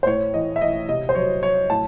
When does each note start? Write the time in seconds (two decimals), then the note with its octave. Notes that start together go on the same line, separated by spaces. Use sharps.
0.03 C5
0.06 A2 C#5
0.34 E3 D#5
0.56 E5
0.61 E3 D#5
0.89 C3 D#5
1.09 C5
1.15 F#3 C#5
1.42 F#3 C#5
1.70 A2 A5